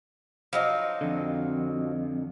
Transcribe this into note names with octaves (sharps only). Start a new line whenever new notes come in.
F3 F#3 D#4
F2 D3